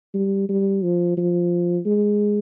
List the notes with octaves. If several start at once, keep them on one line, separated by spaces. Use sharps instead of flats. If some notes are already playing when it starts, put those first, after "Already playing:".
G3
G3
F3
F3
G#3